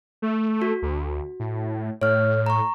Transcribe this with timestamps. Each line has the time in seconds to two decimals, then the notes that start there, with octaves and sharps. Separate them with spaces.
0.22 A3
0.62 F#4
0.82 D2
1.40 A2
2.01 A2 C#5 F6
2.46 A#5 C#6